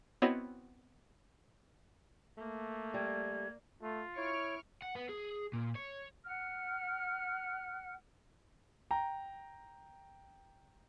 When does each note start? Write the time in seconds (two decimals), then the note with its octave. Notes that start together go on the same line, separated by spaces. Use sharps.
0.22 B3 C4 E4 F#4 C#5 D#5
2.38 A3 A#3
2.94 G3 G#6
3.82 A3 F4
4.17 E4 C#5 C#6 F6 D7
4.82 F#5
4.96 B3
5.09 G#4
5.53 A#2
5.75 C#5
6.24 F#5 F6
8.91 G5 A#5